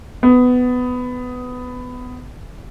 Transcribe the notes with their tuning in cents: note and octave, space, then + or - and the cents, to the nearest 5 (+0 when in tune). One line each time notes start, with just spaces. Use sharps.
B3 +15